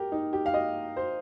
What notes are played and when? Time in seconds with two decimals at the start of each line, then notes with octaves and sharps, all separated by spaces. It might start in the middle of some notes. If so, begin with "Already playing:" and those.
Already playing: G4 A#4
0.12 D#4
0.33 G4
0.46 F5
0.54 D#5
0.96 C5